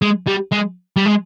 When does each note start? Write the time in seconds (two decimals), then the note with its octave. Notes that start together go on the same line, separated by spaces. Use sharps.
0.02 G#3
0.27 G3
0.52 G#3
0.96 G3
1.06 G#3